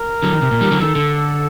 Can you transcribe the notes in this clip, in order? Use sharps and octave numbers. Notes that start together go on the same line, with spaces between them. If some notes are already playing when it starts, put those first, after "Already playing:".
Already playing: A#4
D3 F#3
D#3
C3
A#2
D#3 G3
D3 F#3
D#3 A4
D3